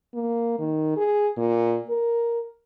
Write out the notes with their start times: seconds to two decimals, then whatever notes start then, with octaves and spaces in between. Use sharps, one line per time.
0.15 A#3
0.59 D#3
0.97 G#4
1.38 A#2
1.90 A#4